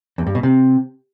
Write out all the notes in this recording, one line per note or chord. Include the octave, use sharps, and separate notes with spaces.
E2
G2
B2
C3